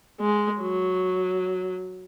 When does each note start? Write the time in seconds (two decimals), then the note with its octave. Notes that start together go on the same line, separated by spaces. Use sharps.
0.21 G#3
0.60 F#3